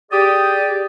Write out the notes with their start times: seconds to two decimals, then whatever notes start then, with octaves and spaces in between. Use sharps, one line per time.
0.12 G4 G#4 D5 D#6